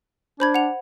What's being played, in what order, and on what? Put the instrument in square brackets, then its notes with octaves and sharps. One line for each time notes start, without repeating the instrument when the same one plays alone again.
[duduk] D4 [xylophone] C5 B5 G#6
[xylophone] F#5 F7